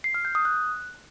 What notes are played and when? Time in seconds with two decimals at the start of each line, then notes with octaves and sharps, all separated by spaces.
0.04 C7
0.14 F6
0.25 G6
0.35 D#6
0.45 F#6